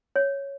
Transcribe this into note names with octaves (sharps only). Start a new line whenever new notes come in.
C#5